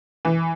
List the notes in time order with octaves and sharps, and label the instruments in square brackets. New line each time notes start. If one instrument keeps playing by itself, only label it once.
[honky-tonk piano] E3